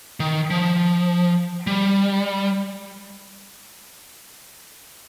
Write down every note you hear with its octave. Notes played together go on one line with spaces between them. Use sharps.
D#3
F3
G3